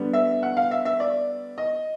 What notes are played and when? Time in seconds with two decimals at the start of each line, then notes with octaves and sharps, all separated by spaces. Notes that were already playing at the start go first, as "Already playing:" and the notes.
Already playing: D3 G3 B3
0.13 E5
0.43 F#5
0.57 F5
0.71 E5
0.85 E5
1.00 D5
1.58 D#5